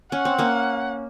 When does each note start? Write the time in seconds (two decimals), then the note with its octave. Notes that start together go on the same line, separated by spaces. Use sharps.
0.12 C#4 F#5
0.25 C4
0.38 A#3 C#4